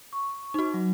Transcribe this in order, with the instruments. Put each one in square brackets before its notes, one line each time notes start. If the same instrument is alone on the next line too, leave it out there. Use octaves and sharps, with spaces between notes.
[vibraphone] C#6
[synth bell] D#4 F#4
[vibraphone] F#3